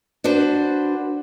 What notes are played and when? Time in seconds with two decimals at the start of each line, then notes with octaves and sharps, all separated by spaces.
0.24 D4 F#4 B4 C5